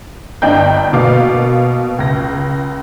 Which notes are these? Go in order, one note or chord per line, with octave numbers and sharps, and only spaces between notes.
G1 D4 D#5 G5 G6
B2 A#3 F5 D6
C#2 A#6